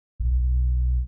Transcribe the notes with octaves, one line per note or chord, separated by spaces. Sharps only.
B1